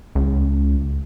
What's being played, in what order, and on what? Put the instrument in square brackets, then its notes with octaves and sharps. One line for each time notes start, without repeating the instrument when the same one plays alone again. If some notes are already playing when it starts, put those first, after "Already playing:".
[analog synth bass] C#2